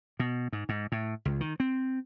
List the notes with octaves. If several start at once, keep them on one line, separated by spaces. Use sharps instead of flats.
B2
G#2
G#2
A2
C#2
D#3
C4